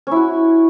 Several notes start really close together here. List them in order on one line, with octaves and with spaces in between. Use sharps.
C#4 E4 F#4